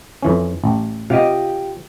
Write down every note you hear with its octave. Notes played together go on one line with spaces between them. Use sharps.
F2 E3 C#4
A1
C3 F4 G4 D#5 F5 F#5